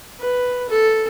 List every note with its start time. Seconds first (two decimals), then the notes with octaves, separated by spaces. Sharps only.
0.19 B4
0.69 A4